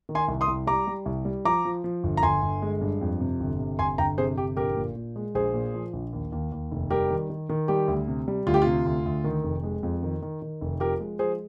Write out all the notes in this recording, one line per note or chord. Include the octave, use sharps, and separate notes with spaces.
D#3
G#5 C6
C2
C6 D#6
C2
G3 A#5 D6
G3
C2
G3
F3 A#5 D6
F3
F3
G1
A#5
G1 G#5 C6
G1
G#3
G2
F2
C3
G1
C3
G1 G#5 C6
G1 G5 A#5
C3 G#4 C5
G1 G4
A#1 G4 A#4
A#2
A#2
G#3
A#1 G#4 C5
A#2
F3
A#1
D#2
D#2
D#2
F1
G3 G4 A#4
D#3
D#3
D#3
G3 G4
D2
C3
G3
D2 F4
G4
C3 F4
D2
D2
D#3
F1
G#3
F2
D#3
D#3
D#3
F1
F3 G4 A#4
G#3
F3 G#4 C5